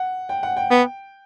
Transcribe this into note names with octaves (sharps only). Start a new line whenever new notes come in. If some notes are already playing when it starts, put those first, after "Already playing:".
Already playing: F#5
G5
F#5
G5
B3